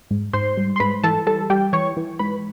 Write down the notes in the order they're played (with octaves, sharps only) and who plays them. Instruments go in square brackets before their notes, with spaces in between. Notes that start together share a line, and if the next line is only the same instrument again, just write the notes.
[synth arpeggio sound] G#2
G#2 C5 C6
G3
C6
G#2 B4 B5
E3 A4 A5
G3 A4 A5
G3 G4 G5
E3 C#5 C#6
E3
G#2 B4 B5